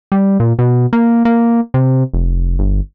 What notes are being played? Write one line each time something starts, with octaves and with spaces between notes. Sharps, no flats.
G3
A#2
B2
A#3
A#3
C3
F1
G1